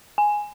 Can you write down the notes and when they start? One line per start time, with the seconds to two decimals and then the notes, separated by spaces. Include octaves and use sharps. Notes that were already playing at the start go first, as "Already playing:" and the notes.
0.18 G#5